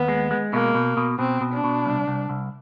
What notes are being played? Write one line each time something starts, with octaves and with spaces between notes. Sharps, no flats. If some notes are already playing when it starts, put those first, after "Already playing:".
Already playing: D#2 B3
G#3
G#3
B2 A#3
B2
B2
B2 C4
B2
D4
B2
C2
C2
C2